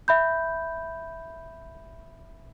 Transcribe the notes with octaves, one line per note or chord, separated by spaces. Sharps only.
E5 B5 G6